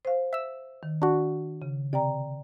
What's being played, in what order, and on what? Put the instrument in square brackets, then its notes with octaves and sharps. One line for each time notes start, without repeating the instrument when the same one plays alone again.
[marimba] C5 F5
[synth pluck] E5 E6
[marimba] D#3
[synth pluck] D4 F#4
[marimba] C#3
[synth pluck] C3 [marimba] D5 G5 A#5